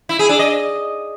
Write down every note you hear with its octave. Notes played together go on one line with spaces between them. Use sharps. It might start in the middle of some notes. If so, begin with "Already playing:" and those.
E4
G#4
D4
D#5